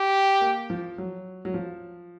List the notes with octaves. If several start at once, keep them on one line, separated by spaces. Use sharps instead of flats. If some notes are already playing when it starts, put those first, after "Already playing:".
Already playing: G4
A#3
F3
F#3
F#3
F3